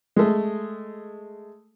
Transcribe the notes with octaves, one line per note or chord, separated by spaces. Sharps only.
G#3 A3